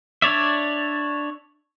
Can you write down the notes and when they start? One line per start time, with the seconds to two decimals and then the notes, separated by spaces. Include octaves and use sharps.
0.22 D4 C#5 D5 E5